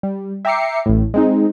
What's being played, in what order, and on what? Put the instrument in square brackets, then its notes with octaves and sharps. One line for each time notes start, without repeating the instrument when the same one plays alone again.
[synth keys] G3
E5 G5 A#5 D6 C7 C#7
A1 A2
G#3 C4 D#4